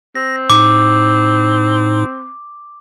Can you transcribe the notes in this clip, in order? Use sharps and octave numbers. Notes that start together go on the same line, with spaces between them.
C4 A#6
A2 D#4 D6